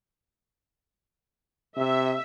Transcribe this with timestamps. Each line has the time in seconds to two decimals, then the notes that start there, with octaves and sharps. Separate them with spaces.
1.77 C3 E5